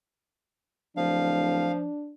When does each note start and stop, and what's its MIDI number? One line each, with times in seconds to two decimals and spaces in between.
0.97 1.75 26
0.97 1.88 53
0.97 2.14 62
0.97 1.72 77